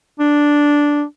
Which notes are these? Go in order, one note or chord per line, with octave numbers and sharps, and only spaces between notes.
D4